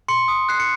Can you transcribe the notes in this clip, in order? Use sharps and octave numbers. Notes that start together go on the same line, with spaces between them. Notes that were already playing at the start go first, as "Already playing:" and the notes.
C6 C#7
D#6
F#6 C7
C#7